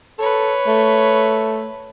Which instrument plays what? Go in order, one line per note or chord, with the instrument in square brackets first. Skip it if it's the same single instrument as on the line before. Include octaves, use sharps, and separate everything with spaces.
[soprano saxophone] A4 [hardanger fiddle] B4 C#5
[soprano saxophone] A3